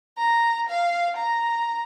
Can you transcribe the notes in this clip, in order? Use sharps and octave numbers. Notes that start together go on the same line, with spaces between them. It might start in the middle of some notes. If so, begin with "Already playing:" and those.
A#5
F5
A#5